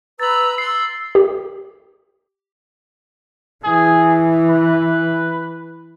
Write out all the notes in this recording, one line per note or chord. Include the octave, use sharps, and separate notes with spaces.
B4 A#5 E6 A6 F#7
C6 E6 C7
G4
E3 G#4
B4